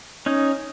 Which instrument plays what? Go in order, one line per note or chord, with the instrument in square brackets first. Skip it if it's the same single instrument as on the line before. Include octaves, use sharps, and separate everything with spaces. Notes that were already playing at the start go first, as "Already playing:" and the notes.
[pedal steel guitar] C#4 D#4